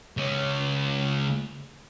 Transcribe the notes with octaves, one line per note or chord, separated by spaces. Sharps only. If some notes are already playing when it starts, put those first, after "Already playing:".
C#2 C#4